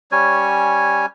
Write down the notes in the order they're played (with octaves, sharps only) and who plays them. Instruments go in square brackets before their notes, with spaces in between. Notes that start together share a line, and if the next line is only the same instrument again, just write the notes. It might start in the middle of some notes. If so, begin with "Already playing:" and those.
[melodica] G3 C#4 C#5 G#5